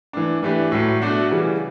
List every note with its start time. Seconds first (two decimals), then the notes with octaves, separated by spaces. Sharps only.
0.13 E3 A3 D4
0.43 E3 A3 D4 G4 B4
0.72 A2 F#3 A3
1.02 B2 A3 D4 F#4
1.31 C#3 E3 G3